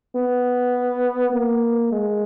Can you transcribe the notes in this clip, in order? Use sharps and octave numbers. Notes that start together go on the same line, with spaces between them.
B3
A#3
G#3